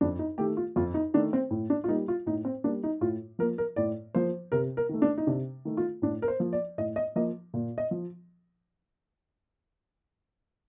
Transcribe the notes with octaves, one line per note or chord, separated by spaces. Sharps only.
F2 D4
D#4
D#3 A3 G4
F4
F2 F4
D#4
D#3 A3 D4
C4
A2
D4
F4
G3 A#3 D#4
F4
A2 D#4
C4
G3 A#3 D4
D#4
A2 F4
F3 A#3 A#4
A#4
A2 D5
F3 A#3 C5
C3 A#4
A#4
D#3 A3
D4
D#4
C3 D4
D#3 A3
F4
A2 D4
A#4
C5
F3 A#3
D5
A2 D#5
D#5
F3 A#3 D#5
A#2
D#5
F3